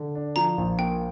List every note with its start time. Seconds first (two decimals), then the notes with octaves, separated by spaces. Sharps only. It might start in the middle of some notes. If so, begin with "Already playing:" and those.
Already playing: D3
0.15 D4
0.36 F3 A#5
0.58 A#1
0.78 A#3 G5